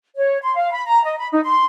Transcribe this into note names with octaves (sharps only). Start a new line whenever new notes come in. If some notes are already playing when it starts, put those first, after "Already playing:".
C#5
C6
F5
B5
A#5
D#5
B5
D#4
C6